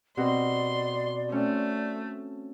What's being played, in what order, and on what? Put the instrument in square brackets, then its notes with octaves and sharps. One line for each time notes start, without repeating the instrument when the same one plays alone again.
[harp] B2 C4 F#4 [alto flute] D5 [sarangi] C6
[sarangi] A3 [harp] C4 C#4